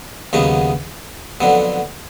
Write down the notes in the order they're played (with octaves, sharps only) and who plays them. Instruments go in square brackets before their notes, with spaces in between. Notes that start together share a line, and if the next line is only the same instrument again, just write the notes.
[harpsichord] D#2 C#3 F#3 B3 D#4
F2 D3 F#3 B3